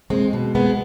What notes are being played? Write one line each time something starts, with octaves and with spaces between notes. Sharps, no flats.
G#3 C4
B2
G#3 B3